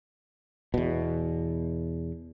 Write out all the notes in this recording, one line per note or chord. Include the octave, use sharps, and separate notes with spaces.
E2 B2